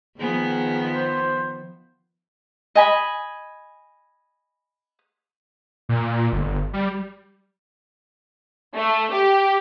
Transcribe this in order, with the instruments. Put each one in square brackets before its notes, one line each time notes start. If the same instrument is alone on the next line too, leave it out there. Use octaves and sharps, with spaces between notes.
[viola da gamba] D#3 F3 B3 [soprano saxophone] G#4
[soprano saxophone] C5
[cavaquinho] D#5 G#5 B5
[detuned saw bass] A#2
G1
G3
[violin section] A3
G4